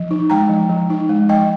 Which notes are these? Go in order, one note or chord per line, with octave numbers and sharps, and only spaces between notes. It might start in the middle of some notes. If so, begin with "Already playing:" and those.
Already playing: F3
D#4
G#3 G5 A#5
F3
F3
D#4
G#3
F3 D#5 G5